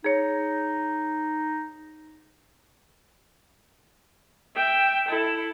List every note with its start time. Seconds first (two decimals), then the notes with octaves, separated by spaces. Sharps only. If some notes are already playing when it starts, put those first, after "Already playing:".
0.04 D#4 G#4 C#5
4.56 E5 G5
5.08 E4 A4